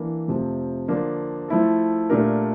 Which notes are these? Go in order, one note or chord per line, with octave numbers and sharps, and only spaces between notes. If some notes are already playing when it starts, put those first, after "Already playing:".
Already playing: E3 A#3 D4 A4
F2 C3 F3 A3
D3 F3 A#3 D4
F3 A3 E4 A4
A#2 A3 D4 G4 A#4